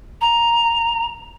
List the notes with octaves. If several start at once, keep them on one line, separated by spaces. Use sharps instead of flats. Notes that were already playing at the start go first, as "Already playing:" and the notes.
A#5